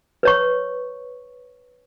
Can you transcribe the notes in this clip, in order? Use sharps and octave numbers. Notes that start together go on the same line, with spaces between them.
B4 C#5 C#6